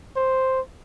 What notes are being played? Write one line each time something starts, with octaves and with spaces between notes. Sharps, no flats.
C5